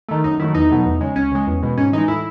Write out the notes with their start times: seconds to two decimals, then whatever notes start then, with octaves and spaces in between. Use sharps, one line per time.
0.09 D#3 A3
0.24 F#2 D#4
0.40 D#3 F#3 A3 E4
0.55 E2 D#4
0.70 B2 F#3 A3
0.86 E2
1.01 C#3 G#3
1.16 C#2 C#4
1.32 C#3 G#3
1.47 E2
1.63 B2 G#3
1.78 G#2 C#4
1.93 E3 G#3 D#4
2.08 A2 E4